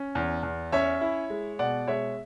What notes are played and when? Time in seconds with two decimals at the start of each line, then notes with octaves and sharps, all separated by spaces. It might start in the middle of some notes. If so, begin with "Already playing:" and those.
Already playing: C#4
0.15 E2
0.43 E2
0.72 C#4 C#5 E5
1.01 E4
1.30 G#3
1.59 B2 D5 F#5
1.88 G#3 C#5 E5